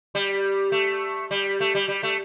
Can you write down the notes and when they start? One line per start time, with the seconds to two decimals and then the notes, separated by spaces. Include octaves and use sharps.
0.15 G3
0.72 A3
1.31 G3
1.60 A3
1.75 G3
1.88 G3
2.03 A3